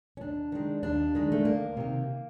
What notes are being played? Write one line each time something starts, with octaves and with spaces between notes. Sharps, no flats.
C#4
D#2 D4
D#3 G#3
D#2 D4
D#3 G#3
A3
D2 A#3
C3 D#3